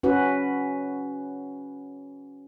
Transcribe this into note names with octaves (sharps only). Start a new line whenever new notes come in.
C#4 F#4 B4